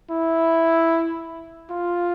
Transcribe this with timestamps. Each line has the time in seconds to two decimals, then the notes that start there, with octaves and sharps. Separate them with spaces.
0.11 E4
1.71 F4